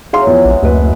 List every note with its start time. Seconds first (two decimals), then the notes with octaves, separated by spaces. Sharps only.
0.13 E3 F#3 C4 G#4 F5 C6
0.27 E2 F3
0.45 A#1 G#3
0.63 F#1 D2 B4